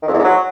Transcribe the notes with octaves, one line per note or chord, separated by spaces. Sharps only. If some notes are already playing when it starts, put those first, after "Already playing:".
D#3
F2
E2
G#2
F#3